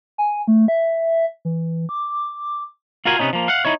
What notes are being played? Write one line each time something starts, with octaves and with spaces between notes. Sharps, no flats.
G#5
A3
E5
E3
D6
F4 F#4 A#4 F5 G#5
C3 B3 C#4 D#4
F3 A#3
F5 F#5
D#4 E4 C#5